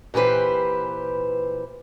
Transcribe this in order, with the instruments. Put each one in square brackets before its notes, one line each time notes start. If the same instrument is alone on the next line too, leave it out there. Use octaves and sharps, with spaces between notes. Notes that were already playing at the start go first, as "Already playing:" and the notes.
[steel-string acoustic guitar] A#2 E3 G4 B4 C5